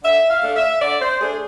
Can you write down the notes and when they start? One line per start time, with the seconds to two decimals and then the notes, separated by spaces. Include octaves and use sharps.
0.03 D3 E5
0.29 F5
0.43 A3 D4
0.56 E5
0.81 D3 D5
1.01 C5
1.20 A3 D4 G#4